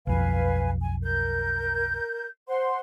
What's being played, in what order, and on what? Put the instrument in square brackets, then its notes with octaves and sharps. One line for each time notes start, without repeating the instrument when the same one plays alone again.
[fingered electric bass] B1 F2 [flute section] B4 F5 G#5
[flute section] G#5
A#4 G6
C5 F#5 C6